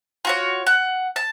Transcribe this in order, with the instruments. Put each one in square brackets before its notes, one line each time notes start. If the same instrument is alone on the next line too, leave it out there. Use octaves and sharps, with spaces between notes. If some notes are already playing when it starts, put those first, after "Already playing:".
[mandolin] F4 F#4 C#5
F#5
A5